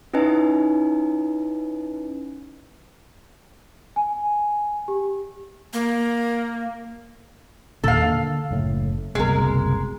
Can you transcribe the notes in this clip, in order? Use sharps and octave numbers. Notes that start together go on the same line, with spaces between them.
C#4 D#4 E4 B4 D#5 G#5
G#5
G4
A#3
D#2 A#2 D3 A4 F5
D3 A#3
F#1 A2
F#1 C2 B2 G#3 A#4